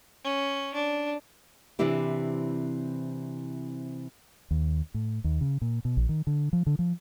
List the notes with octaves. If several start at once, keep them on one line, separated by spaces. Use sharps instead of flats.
C#4
D4
C3 E3 C4 D4 E4 G4
D#2
A2
D#2
C#3
A#2
B2
A#1
D#3
D3
F3
D3
F3